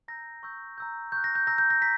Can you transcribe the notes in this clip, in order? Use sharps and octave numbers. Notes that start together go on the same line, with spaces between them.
A#5 E6 G6 A#6
C#6 E6 G6
A#5 E6 G6
C#6 F#6 G6
A#6
G6
A#5 E6 G6 A#6
G6
A#6
A#5 B6